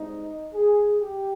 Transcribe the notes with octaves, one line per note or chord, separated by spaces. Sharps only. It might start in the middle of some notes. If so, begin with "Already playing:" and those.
Already playing: G#2 G3 C4 D#4
G#4
G4